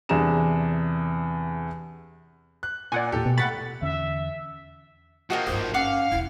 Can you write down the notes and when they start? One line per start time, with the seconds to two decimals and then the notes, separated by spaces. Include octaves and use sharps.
0.09 E2 C3 D4 G#4 A#5 E7
2.63 F#6
2.92 A#2 D5 F#5 G#5
3.12 E2 A#2 G4 A4
3.26 B2
3.38 A2 F#5 B5 F#6 A6
3.82 E2 D3 C#4 E5
5.30 F3 A#3 F#4 D#5 G5
5.47 G#1 G2 C5 D#5
5.74 C#4 F5 F#5 D6
6.11 E1 E2 E4